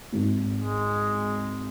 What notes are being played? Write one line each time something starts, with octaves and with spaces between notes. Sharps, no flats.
G#1
G#3